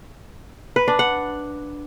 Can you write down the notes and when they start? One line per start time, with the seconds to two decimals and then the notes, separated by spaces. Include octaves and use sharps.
0.76 B4
0.88 D4
0.99 F#5